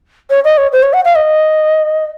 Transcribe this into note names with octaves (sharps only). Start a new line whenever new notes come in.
C#5
D#5
C#5
C5
C#5
F#5
F5
D#5